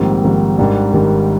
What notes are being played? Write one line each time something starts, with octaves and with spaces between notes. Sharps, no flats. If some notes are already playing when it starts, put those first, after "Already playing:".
Already playing: A#1 G#2 D#3 G3 C4
A#1 G#2 D#3 G3
G#1 G#2 D#3 G3 D4
G#1 G#2 D#3 G3